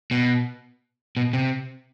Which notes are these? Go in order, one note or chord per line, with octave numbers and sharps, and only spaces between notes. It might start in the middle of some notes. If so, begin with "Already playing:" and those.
B2
B2
C3